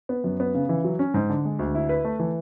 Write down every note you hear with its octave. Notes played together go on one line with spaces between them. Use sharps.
B3
F#2
B3
C#3
E3
F#3
C#4
G#2
D3
G#3
D2
E4
B4
A3
E3